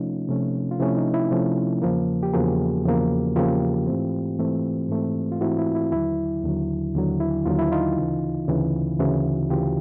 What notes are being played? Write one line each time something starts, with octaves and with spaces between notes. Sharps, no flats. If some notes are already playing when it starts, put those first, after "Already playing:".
Already playing: C3 F3 A3 C#4 D#4 F4
C3 F3 A3 C#4
F4
C3 F3 A3 C#4 E4
D#4
E4
C3 F3 A3 C#4
E2 C#3 F3 A#3
G4
E2 C#3 F3 A#3 F#4 G#4
E2 C#3 F3 A#3
E2 C#3 F3 A#3 F4 G4
G#2 E3 A3 C4
G#2 E3 A3 C4
G#2 E3 A3 C4
F4
G#2 E3 A3 C4 E4 F#4
E4
E4
D#2 D3 F#3 E4
D#2 D3 F#3
D#2 D3 F#3
E4
D#2 D3 F#3 F4
E4
D#4 F4
D2 C#3 E3
D2 C#3 E3
D2 C#3 E3 E4 F#4
D2 C#3 E3 F4 G4